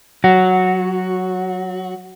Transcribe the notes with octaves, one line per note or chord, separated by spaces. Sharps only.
F#3 F#4